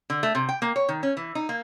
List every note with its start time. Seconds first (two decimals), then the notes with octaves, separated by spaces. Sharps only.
0.10 D3
0.23 A3
0.35 C3
0.49 G5
0.62 A#3
0.76 C#5
0.89 D#3
1.03 C#4
1.17 E3
1.35 D#4
1.49 A#3